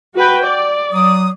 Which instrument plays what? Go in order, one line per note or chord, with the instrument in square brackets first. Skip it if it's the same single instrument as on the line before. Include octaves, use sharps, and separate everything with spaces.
[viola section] F#4 B4 G5
D5
[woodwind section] F#3 D#6